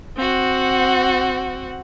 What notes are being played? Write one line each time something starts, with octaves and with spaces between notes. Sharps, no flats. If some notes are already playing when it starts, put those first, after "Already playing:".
C4 F#4 F#5